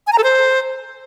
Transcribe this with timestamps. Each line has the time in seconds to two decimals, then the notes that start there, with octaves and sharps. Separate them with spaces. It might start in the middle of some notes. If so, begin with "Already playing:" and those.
0.07 G#5
0.12 A#5
0.18 A4
0.24 C5